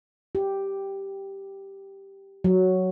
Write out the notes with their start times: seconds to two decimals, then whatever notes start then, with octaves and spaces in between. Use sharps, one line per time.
0.35 G4
2.44 F#3